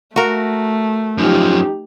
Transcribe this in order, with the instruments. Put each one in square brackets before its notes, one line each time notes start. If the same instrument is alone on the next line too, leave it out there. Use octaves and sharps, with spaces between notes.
[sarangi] A3 [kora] F#4 A#4
[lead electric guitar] F#2 F3 [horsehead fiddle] D#4 G4